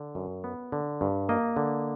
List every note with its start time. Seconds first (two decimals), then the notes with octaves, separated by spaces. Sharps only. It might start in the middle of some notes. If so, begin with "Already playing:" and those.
Already playing: D3
0.15 F#2
0.44 B3
0.72 D3
1.01 G2
1.29 A#3 D#5
1.57 D3